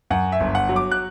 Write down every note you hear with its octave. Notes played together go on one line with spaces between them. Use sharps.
F#2 F#5
E5
G1
F#5
F#3
D6
F#6